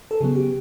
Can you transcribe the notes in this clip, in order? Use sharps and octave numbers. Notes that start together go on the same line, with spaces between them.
A4
C#3 F#3 B3 G#4
G4